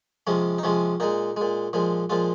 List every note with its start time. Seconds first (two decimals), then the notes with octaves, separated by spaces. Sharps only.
0.27 C3 F3 G#3 C#4
0.58 D#4
0.63 C3 F3 G#3 C#4
1.00 A#2 G#3 D#4
1.37 A#2 G#3
1.73 A#2 F3 G#3
2.10 A#2 F3 G#3 F4